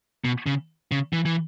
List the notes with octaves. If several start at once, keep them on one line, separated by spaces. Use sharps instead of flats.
B2
C#3
C#3
E3
E3